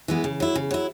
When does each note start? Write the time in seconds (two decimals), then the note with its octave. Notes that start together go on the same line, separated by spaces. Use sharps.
0.08 E3 G#3 B3
0.24 C#3
0.40 F#3 E4
0.55 C#3
0.71 F#3 E4